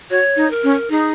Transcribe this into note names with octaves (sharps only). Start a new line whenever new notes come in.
F#4 C#5
D#4
A#4
C#4
D#4 G#4